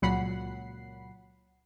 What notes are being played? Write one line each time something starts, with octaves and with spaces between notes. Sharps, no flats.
C#2 A#2 F#3 F#5 B5 C7